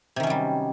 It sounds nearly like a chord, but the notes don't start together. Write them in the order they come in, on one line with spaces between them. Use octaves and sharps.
C3 D#3 C#4 F#3 G3